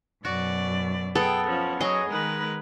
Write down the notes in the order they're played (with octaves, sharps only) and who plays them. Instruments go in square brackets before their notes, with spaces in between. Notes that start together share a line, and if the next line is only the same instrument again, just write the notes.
[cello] F#2 B2 [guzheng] F#4 [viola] D5
[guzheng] B3 [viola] G#4 G5 [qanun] A4
[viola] F3 C#4
[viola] F#3 [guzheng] G#4 [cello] C#5 [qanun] D#5
[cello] D#3 A#4 [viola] G#3 B4